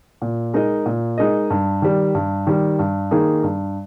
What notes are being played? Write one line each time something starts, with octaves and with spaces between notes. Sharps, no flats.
A#2
G#3 D#4 A#4 D#5
A#2
G#3 D#4 A#4 D#5
G2
D#3 G3
G2
D#3 G3
G2
D#3 A#3 D#4 G#4
G2